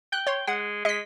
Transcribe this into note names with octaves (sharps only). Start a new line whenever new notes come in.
G5 F#6
C#5 C6
G#3 F#5
G#3 D#5 B6